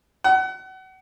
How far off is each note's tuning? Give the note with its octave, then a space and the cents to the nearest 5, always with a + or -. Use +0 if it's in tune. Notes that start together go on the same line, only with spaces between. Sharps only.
F#5 +30